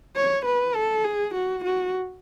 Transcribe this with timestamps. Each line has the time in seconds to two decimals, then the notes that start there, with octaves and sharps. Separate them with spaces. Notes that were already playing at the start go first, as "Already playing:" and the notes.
0.15 C#5
0.45 B4
0.75 A4
1.04 G#4
1.34 F#4
1.64 F#4